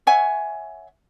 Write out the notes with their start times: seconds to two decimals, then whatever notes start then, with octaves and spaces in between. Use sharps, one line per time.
0.07 C#5 E5 F#5 G#5